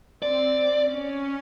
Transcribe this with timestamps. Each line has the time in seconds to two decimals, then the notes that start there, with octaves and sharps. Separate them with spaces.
0.23 C4 D5
0.87 C#4